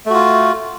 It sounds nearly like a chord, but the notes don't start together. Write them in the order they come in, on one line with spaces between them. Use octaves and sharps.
A3 F#4 F4